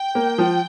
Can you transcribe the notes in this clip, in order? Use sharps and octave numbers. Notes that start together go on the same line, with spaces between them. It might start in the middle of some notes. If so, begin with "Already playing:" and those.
Already playing: G5
A#3
F3